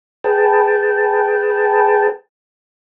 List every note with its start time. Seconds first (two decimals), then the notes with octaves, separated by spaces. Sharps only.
0.24 G#4 B4 G5 A5